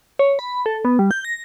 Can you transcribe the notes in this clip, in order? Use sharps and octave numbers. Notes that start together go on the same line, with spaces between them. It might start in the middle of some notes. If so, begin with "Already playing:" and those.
C#5
B5
A4
B3
G3
G6
A#6